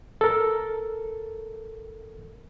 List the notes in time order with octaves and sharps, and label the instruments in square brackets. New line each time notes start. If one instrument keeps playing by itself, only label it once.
[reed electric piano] A4 A#4